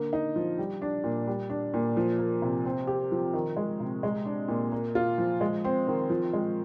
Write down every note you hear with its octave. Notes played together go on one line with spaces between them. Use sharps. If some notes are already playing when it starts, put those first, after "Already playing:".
Already playing: D3 A#3
D#4
F3
G3
D4
A#2
G3
D4
A#2
F3
A#3
C3
C4
G4
F3
D#3
G#3
C3
G#3
D4
A#2
A#3
F4
F3
G#3
C4
D#3
F3
G#3